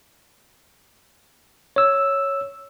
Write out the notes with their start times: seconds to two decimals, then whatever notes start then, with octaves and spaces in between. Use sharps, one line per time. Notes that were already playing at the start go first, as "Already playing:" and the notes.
1.76 C#5 E6